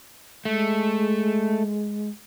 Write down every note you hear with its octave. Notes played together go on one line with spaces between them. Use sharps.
G#3 A3